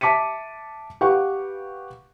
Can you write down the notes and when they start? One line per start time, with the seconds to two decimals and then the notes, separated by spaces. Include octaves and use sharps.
0.01 E5 A5 D6 B6 C#7 D#7
1.01 G4 B4 F5 F#5 C#6